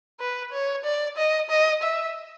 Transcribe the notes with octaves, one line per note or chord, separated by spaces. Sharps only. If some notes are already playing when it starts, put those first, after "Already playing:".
B4
C#5
D5
D#5
D#5
E5